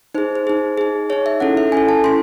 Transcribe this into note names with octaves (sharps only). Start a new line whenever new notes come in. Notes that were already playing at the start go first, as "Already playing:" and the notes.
D#4 G#4 C5
C5
D#4 G#4
D#4 G#4
D#4 G#4 C#5
E5
C#4 E4 A4 F#5
E5
C#4 E4 A4 G#5
A5
C#4 E4 C6